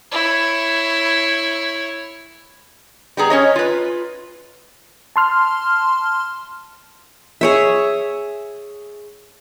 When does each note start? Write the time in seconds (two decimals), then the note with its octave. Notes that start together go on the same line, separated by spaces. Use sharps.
0.11 E4 C#5
3.17 G3 B3 G#4 A#5
3.30 C#4 C#5 D#5
3.56 F4 B4
5.16 A5 C6 F6
7.41 G#4 C#5 E5